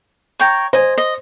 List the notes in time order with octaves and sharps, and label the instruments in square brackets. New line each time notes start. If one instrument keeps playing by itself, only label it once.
[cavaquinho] C#5 G5 A#5
[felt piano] C5 [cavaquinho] D#5 G#5
[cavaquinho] D#5